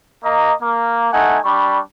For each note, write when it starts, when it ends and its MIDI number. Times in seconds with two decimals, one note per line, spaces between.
0.24 0.51 58
0.24 0.51 75
0.24 0.51 82
0.62 1.10 58
1.12 1.38 57
1.12 1.38 63
1.12 1.38 78
1.12 1.38 80
1.44 1.80 55
1.44 1.80 62
1.44 1.80 83
1.44 1.80 85